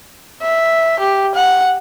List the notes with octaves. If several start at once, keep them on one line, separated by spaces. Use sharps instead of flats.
E5
G4
F#5